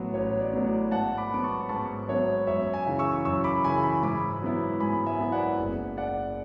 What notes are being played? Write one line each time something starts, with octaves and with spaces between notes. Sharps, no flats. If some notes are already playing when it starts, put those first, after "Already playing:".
Already playing: A1 A2 F#3 B3
A1 C#5
D5
A2 F#3 B3
D5
G#2 F#5 A5
B5 D6
F#3 B3 D6
A5 C#6
G#2 A5 C#6
F#3 B3 C#5 E5
F#2 C#5 E5
E5 G#5
C#3 E3
C#6 E6
F#2 C#6 E6
B5 D6
C#3 E3 G#5 B5
G#5 B5
G#2 B5 D6
F#3 B3 E4
G#2 G#5 B5
E5 G#5
F#3 B3 E4
D5 F#5
F#1
D5 F#5